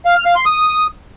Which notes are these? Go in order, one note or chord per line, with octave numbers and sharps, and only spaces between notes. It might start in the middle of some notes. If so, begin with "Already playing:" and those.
F5
F6
F5
C6
D#6